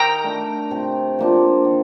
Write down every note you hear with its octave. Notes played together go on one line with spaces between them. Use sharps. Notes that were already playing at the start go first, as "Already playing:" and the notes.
Already playing: D#3 G5 A#5
A3 D4
C3
F3 A#3 D4
D#3